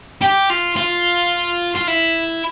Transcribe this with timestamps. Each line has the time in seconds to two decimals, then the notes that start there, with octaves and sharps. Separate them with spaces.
0.21 G4
0.50 F4
0.77 F4
1.75 F4
1.87 E4